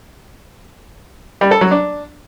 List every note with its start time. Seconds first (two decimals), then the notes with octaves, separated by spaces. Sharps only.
1.41 G3
1.51 A4
1.61 F#3
1.71 D4